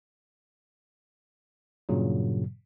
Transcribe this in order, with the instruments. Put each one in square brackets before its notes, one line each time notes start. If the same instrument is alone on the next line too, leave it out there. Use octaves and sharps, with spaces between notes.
[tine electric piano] G2 A#2 C#3 F#3